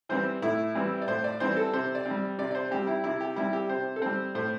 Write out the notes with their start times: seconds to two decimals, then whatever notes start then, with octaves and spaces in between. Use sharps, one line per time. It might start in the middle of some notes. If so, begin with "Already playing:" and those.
0.09 E3 G3 C4 C5
0.42 A2 E4
0.75 E3 G3 C4
1.02 D5
1.08 A2 C5
1.24 D5
1.40 E3 G3 C4 C5
1.57 A4
1.73 C3 C5
1.95 D5
2.06 C4
2.11 G3
2.38 C3 D5
2.51 D5
2.55 C5
2.71 G3 C4 G4
2.87 E4
3.04 C3 E4
3.21 G4
3.36 G3 C4 E4
3.53 G4
3.69 C3 C5
3.96 A4
4.02 G3 C4 C5
4.35 A2 C5